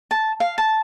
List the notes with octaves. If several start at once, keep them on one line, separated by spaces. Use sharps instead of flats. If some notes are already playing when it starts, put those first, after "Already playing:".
A5
F5
A5